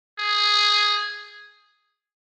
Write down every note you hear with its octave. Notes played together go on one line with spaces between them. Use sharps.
G#4